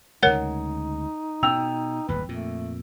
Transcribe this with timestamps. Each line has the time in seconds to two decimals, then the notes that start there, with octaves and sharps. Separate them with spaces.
0.23 D2 C#3 G#3 D#4 A#4 C#5 F#5
1.43 B2 G5 E6 F7
2.08 D1 G1 D#2 B4
2.29 F2 A#2 A3